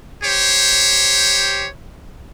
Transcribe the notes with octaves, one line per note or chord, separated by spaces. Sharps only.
G4 C5 C#5